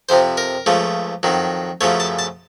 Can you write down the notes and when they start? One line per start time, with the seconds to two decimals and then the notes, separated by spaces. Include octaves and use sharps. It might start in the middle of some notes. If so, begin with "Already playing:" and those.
0.09 F2 C3 F3 C5
0.37 A#4
0.66 C#2 C#3 F3 A3
1.23 F2 D#3 F#3
1.81 F#2 C#3 F3 A3 C#5
2.00 A5
2.19 A5